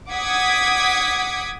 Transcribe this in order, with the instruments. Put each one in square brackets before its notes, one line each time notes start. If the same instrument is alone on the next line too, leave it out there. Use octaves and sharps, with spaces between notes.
[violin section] F#5 D6 D#6 G#6 B6